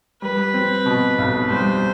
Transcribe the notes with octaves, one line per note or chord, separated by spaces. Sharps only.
G3 B4
C4
B2
B1
G3 C5